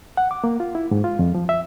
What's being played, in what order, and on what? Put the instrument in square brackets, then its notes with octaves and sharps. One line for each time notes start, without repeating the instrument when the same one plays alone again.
[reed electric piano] F#5
D6
A#3
F4
E4
G#2
F4
F2
F3
E5